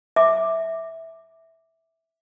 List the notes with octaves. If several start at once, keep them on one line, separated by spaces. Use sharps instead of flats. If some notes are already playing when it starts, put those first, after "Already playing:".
E5 D6